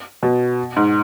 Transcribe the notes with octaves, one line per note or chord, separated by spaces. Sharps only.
B2
G#2